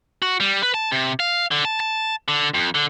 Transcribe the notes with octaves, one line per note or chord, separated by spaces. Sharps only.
F#4
G3
B4
A5
C3
F5
D3
A5
A5
D3
F2
D3